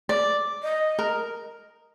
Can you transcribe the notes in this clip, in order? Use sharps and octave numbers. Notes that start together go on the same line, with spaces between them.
D5
D#5
A#4